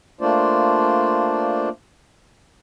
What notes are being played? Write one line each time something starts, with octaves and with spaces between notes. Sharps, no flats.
A3 A#3 D4 F4 C5 D5